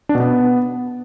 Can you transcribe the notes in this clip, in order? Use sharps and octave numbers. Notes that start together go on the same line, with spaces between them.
D4
B2
B3